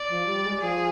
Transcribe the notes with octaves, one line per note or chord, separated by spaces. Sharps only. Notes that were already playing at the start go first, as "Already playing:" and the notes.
Already playing: D5
F3
G3
G#3
F3 G#4